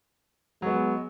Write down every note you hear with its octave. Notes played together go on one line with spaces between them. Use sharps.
F#3 G#3 B3